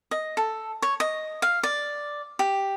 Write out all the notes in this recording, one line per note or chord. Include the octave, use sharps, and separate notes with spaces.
D#5
A4
C#5
D#5
F5
D5
G4